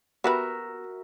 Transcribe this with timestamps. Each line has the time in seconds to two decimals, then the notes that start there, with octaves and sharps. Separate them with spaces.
0.24 B3 F#4 G4 A#4 B4 E5